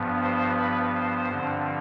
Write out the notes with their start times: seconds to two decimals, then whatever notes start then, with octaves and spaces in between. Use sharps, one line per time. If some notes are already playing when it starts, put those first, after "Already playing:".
Already playing: G2 F3 B3
0.23 C5
0.58 B4
0.94 C5
1.30 G2 D3 F3 C4